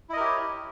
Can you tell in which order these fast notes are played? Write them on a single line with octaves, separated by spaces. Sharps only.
E4 D#5 A#4 G4 C#5